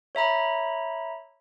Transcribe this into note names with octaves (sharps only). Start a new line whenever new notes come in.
C#5 E5 A#5 B5